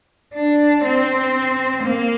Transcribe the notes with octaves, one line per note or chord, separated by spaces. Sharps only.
D4
C4
A#3